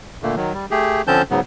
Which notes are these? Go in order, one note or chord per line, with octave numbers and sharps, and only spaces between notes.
A#2 D3 A3 A#3
D#3 F#3
G3
A3 G4 G#4
D3 F3 C4 C#4 A5 G6
G#2 C#3 F#3 B3